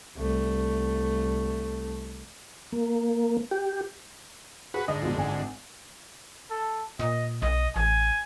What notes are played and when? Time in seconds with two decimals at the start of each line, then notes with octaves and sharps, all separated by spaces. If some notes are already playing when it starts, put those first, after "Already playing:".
0.17 C2 A3
2.72 A#3
3.51 G4
4.74 F#4 G#4 B4
4.88 G#2 D3 D#5
5.02 A#1 B2
5.15 G#1 G#5
6.51 A4
6.99 A#2 D#5
7.42 B1 D#5
7.76 A1 G#5